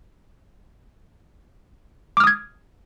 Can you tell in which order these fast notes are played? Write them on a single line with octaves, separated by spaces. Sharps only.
D6 F6 D#6 G#6